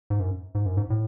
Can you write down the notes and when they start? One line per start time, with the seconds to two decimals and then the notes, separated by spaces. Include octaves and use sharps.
0.10 G#2
0.20 F#2
0.55 G#2
0.66 F#2
0.77 G#2
0.90 A2